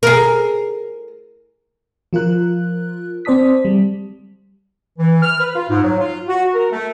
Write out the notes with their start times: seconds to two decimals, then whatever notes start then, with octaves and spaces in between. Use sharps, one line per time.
0.03 G#4 A#4
2.13 F3 F4 A#4 F#6
3.25 C4 C5 D5 A5 D#6 B6
3.65 G3
4.99 E3
5.22 F6
5.40 B4
5.55 F4
5.70 G#2
5.83 F#3
6.00 F4
6.28 F#4
6.54 A#4
6.72 A3